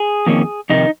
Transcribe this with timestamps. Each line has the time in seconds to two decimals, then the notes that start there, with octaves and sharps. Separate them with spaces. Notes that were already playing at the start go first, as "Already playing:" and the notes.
Already playing: G#4
0.27 F2 D#3 A#3 C#4
0.70 F2 C3 D#3 D#4